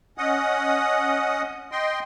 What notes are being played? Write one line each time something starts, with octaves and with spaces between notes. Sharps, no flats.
C#4 D#5 F#5 D#6
D#5 G5 C6